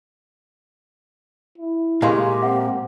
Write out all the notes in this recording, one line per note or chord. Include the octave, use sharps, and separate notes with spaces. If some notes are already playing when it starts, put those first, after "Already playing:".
E4
A#2 G#3 A#3 G4 G#5 C6 C#6
C4 E5 F#5